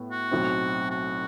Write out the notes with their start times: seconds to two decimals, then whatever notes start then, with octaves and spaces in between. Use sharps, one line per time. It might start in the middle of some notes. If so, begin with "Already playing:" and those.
Already playing: A2 B3
0.11 F#4
0.31 B1 A2 F#3 C4
0.91 F#4